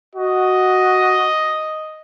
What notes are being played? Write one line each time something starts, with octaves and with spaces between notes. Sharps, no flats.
F#4 D#5